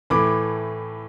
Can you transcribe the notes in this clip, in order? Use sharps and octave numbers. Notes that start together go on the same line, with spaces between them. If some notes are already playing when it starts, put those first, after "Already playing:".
A2 E3 A3 B5 D6